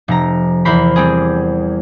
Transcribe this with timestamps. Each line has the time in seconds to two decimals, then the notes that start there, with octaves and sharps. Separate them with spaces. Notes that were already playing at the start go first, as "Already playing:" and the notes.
0.08 F1 A#5
0.65 E2 E3 A#4 C5 B5
0.96 G3 C4 G#4